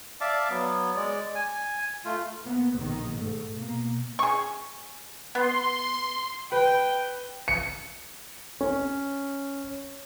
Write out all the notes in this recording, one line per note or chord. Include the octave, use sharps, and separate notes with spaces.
D5 E5 F5 A5 D6
F#3 B3
G#3 D5
G#5
A3 F4
A#3 B3
A#1 D#3
G#2 A3
B2 A#3
G#4 C#6
B3 C6
B4 G5
C#7
C#4